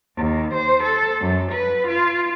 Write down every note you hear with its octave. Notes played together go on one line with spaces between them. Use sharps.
D#2
C5
A4
F#2
B4
F4